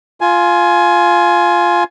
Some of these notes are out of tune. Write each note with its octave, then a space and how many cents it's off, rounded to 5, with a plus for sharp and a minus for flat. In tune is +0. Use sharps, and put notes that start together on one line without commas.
F4 +0 G#5 +20